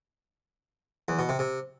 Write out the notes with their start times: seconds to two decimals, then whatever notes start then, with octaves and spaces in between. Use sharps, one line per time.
1.08 E2
1.19 B2
1.29 C3
1.39 C3